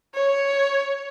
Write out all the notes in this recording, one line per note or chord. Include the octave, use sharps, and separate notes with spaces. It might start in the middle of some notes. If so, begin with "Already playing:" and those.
C#5